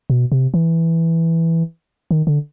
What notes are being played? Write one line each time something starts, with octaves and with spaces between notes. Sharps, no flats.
B2
C3
E3
D#3
D3